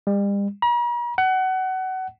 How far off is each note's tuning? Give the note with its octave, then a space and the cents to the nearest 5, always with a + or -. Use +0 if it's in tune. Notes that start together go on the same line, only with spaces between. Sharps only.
G3 +40
A#5 +45
F#5 +25